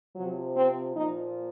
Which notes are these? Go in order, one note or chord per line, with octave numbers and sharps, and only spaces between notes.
C3 F3 F#3
C4
A#2 F3 D#4